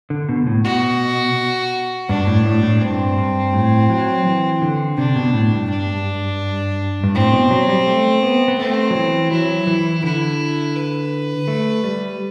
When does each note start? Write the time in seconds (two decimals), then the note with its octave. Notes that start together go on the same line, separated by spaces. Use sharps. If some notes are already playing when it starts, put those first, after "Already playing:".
0.10 D3
0.29 B2
0.47 A2
0.64 B2 F#4
2.09 G2 D4
2.27 A2
2.46 A2
2.63 A2
2.81 G2 C4
3.18 G2
3.53 A2
3.90 F#3
4.26 E3
4.62 D3
4.97 C3 D4
5.16 B2
5.33 A2
5.52 G2
5.70 D4
7.04 G2
7.15 A2 C4
7.32 B2
7.51 F#3
7.69 G3
7.86 A3
8.23 B3
8.48 B3
8.59 A3 C4
8.90 F#3
8.95 E3
9.31 F#3 E4
9.67 E3
10.03 D3 E4
10.76 B4
11.48 A3
11.84 G3